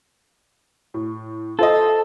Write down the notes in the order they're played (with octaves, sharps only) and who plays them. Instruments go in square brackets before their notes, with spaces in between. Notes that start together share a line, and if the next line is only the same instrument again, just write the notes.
[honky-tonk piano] A2
[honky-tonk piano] F4 C5 D#5 [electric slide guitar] A4